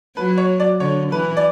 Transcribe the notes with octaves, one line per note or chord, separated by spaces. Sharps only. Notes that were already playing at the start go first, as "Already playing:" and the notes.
F#3 B4
C#5
D5
D3 C#5
E3 B4
D5